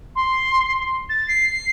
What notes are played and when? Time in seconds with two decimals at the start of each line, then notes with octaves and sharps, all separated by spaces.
0.16 C6
1.09 A6
1.28 C7